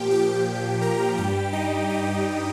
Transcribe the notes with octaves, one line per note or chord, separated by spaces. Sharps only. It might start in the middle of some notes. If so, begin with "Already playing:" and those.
Already playing: A#2 F3 G4 G5
G4 G5
A#4 A#5
G2 G3 G4 G5
D#4 D#5
G4 G5